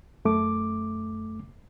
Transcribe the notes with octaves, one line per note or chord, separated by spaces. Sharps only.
F#2 A3 D6